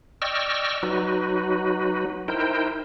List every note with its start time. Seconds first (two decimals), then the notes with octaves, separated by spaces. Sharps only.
0.22 D5 D#5 G5 C#6 E6 F6
0.83 F#3 D#4 F#4 B4
2.28 D#4 E4 A#4 C5 G5